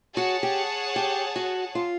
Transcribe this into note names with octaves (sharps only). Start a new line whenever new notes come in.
F#4 G#4 C#5 F#5 A5
G4
G4
F#4
F4